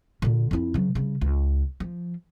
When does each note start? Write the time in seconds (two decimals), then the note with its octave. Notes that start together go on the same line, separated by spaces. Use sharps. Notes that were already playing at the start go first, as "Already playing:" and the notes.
0.22 A#2 D3
0.51 F2 E4
0.74 C#3 F#3
0.95 C#3 G3
1.21 C#2
1.80 F3